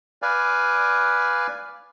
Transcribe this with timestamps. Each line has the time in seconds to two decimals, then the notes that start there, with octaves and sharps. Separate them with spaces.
0.22 B4 D5 F5 G#5